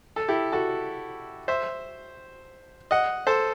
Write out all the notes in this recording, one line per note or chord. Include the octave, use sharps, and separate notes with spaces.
A4
E4 G4
F#4 A4
C5 E5
D#5 F#5
A4 C5